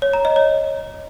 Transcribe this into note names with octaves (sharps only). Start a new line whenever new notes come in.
C#5
A#5
D#5
C#5